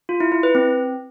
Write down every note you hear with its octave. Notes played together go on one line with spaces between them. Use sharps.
F4
E4
E4
B4
C4